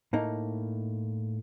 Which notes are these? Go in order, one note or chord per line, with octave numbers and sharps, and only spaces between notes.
A2 A#3 D#4